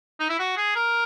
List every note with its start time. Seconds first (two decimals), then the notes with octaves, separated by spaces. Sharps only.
0.20 D#4
0.29 E4
0.39 F#4
0.57 G#4
0.75 A#4